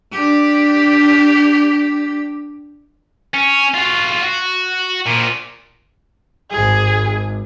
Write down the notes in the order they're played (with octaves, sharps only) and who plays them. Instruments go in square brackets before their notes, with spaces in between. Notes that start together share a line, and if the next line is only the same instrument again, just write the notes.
[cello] D4 G4
[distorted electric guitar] C#4
F4 F#4
F#4
A#2 F3
[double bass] G#1 G#2 [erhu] G#4